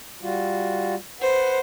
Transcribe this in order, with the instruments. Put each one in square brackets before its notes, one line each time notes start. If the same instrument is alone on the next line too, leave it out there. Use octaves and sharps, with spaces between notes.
[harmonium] G3 F4 F#4
[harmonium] B4 F#5 [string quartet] C5